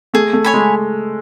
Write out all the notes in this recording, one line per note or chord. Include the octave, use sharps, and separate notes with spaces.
A3 G#4
A3
C#5 G#5 B5
G#3